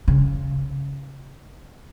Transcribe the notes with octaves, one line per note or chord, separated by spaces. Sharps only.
C#3